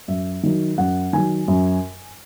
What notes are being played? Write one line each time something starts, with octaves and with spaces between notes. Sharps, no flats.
F#2 E5
D#3 F#3
F#2 F#5
D#3 F#3 G#5
F#2